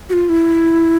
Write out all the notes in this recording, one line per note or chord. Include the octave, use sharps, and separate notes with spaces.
F#4
F4
E4